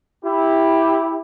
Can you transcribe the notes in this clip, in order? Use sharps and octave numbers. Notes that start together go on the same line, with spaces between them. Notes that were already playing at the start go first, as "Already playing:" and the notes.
E4 G4